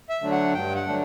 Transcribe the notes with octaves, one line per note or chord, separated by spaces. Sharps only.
E5
D3 F#3 A3 D4
F#5
G2 G5
F#5
D3 F#3 A3 D4